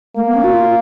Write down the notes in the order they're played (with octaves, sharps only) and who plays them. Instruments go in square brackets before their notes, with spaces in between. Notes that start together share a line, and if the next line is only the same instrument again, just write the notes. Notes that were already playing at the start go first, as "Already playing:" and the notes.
[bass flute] A3 [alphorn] A#3
[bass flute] B3
C#4
F#4
F4